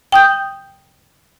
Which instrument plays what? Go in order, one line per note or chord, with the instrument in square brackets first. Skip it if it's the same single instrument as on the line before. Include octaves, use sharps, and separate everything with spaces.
[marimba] G5 D#6 G6